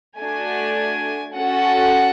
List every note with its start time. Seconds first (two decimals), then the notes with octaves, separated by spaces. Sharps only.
0.18 A3 D4 F#4 G#5
1.34 C#4 F#4 A4 F#5